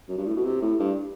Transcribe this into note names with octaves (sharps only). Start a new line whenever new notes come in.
F#2
G2
A2
B2
C3
A2
G2